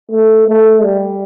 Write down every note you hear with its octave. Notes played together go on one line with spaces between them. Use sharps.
A3
A3
G3